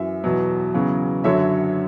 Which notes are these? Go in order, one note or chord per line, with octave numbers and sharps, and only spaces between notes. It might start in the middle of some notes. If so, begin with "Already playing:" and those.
Already playing: F#2 E3 E5
E2 B2 F#3
E2 C#3 F#3
F#2 D3 F#3 C#5 E5